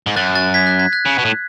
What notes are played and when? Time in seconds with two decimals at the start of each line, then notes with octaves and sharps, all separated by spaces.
0.07 G#2
0.16 F#2 F#6 A6
0.35 F#6 A6
0.54 G#6 B6
0.67 F#6 A6
0.79 G#6 B6
0.92 F#6 A6
1.06 C#3
1.18 B2
1.25 A2